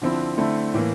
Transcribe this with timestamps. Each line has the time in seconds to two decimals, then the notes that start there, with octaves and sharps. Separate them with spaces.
0.02 D3 F3 C4 E4
0.37 D3 A3 C4 E4
0.74 A2 E3 A#3